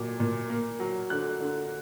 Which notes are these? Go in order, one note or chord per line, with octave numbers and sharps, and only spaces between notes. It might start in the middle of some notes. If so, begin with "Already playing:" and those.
Already playing: A#2 F#3 D6
A#2
A#3
F#3
D3 F#6
D3